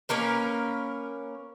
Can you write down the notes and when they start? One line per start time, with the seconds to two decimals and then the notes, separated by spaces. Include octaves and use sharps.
0.09 A#3 C#4 A#4 B4